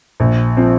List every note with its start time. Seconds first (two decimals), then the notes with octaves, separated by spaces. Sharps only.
0.20 A#1
0.57 F3 C4